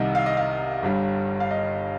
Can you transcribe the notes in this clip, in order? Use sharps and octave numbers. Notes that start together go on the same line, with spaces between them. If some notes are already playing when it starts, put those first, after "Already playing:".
Already playing: C2 C3 D#3 G3 D#5
F5
D#5
F5
G1 G2 G3
F5
D#5